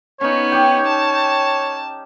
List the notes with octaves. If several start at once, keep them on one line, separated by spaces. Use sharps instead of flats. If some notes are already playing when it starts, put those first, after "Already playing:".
B3 C#4 D#4 C#5
D#4 G4 G5
A5